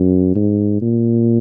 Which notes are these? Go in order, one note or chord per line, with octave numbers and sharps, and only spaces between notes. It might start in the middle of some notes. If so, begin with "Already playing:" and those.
Already playing: F#2
G#2
A#2